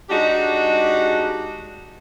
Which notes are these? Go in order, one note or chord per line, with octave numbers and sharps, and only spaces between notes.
G#3 D4 D#4 F#4 G4